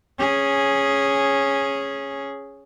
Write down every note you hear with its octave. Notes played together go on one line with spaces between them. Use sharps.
C#4 G#4